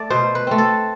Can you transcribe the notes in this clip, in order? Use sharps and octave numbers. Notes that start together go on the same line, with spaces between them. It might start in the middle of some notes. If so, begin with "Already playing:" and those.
Already playing: A3 D5
B2 C5
B4
A3 C4
A4